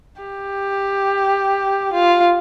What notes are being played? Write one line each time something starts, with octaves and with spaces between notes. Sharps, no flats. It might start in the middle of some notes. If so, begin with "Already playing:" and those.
G4
F4